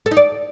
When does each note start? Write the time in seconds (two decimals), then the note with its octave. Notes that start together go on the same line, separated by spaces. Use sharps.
0.06 A4
0.11 D#4
0.17 D5